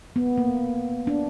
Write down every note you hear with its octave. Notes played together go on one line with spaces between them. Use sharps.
B3
A#3
D4